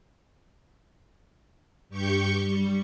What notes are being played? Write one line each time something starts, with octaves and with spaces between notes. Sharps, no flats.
G2 G4 C#6 G6 C#7
G3